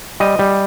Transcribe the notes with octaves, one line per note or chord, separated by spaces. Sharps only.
G3 D#5
G3